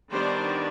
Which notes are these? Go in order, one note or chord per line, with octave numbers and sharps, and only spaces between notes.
D#3 G3 B3 D4 C5